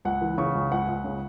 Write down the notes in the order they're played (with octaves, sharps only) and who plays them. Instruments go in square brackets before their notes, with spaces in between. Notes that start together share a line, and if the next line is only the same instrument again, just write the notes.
[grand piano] C#2 F#5
E3
C#3 C#6
C#2
C#2 F#5
C#2
C#3